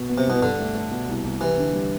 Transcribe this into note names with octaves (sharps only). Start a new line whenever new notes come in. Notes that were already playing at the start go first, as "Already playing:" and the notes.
Already playing: B2
B3
C3
C2 B2
G2 D3
A3
A3
B2
C2
C2
E3 G3
D3
G3